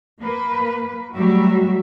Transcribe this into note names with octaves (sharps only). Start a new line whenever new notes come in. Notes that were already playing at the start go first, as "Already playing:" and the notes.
A#3 B4
F#3 G3 A3 F#4 E5